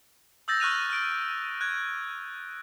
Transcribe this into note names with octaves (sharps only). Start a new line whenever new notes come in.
D#6 E6 G6 A6 A#6
C#6 F6 F#6 D#7 F7
F6 D7
F#6 G#6